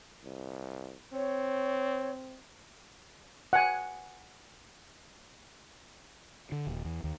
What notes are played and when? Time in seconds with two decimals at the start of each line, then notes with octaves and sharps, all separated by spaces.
0.24 C2
1.13 C4 C#5
3.53 F#5 G#5
6.52 D3
6.67 D#1
6.85 E2
7.04 D#2